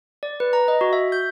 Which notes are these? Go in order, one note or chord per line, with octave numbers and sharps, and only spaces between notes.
D5
B4
A#5
D#5
F#4
E5
G6